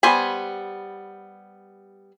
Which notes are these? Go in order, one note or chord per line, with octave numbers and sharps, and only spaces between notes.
G3 B3 C5 G#5 B5